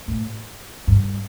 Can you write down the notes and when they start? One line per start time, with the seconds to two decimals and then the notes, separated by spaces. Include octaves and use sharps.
0.08 A2
0.87 G2